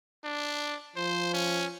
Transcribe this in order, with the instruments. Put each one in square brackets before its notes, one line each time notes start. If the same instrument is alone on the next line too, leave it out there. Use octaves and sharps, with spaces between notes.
[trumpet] D4
[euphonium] F3 [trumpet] C5
[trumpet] C#4